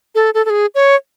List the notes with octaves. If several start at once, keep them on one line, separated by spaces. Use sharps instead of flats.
A4
A4
A4
G#4
C#5